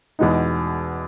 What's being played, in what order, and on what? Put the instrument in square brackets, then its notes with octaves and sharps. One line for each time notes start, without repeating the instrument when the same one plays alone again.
[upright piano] E2 B2 G#3 B3 D#4